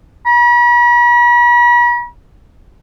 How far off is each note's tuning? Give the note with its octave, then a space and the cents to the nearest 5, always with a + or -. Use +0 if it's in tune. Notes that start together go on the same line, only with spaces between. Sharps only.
B5 -45